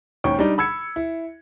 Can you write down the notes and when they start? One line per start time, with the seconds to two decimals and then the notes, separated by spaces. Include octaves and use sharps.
0.24 G#1 D#2 C#4 G5 C#6
0.39 G3 D4 D#4
0.58 B5 E6 G#6 C#7
0.96 E4